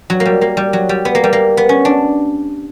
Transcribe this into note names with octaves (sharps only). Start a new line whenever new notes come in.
F#3
A#3
G3
A#3
G3
F#3
G3
B3
A#3
G3
A#3
B3
C#4
D4